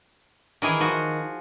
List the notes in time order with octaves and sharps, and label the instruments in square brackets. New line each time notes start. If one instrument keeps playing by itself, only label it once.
[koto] D#3 E3 G#4
[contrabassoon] D#3 [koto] F3 F#4